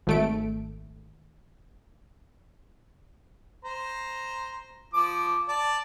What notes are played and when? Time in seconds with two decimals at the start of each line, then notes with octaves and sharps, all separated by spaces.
0.07 G#1 A3 D7
3.64 C5 A#5
4.93 F3 D6
5.48 D5 A5